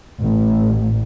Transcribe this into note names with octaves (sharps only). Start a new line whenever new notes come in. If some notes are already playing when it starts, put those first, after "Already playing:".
A1